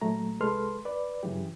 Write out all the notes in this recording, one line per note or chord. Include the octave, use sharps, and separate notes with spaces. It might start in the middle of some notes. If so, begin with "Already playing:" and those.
A#2 F#3 A3 A#5
C2 G#3 A4 B4 C6 F6
B4 D5
G2 C#3 E3 F#3 G4